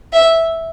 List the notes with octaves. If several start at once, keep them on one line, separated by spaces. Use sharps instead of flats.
E5